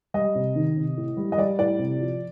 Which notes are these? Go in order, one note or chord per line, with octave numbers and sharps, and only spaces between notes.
G3 D#5
C3
D#3
C3
A2
G3
D#5
G3 D5
A2 D5
C3
F3